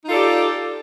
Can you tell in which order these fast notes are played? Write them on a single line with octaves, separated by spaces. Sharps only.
D#4 F4 A4 D5 G4